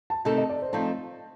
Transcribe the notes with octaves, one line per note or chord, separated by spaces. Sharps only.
A5
C3 D#3 A3 D#4 A4 A5
D#5
D5
C5
F3 A3 C4 D#4 A5